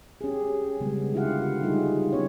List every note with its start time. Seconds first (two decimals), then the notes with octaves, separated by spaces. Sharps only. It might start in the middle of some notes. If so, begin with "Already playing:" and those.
0.21 C#4 G4 G#4
0.80 C#3 G3 G#3 B3
1.14 D3 E4 F4 G4 F5 F#5
1.63 G3 A3 D#4 F4 G4 G#4
2.12 G3 B3 C#4 C#5